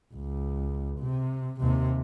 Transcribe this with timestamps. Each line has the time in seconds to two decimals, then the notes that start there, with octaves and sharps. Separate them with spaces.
0.13 C#2
1.00 C3
1.61 D#2 C3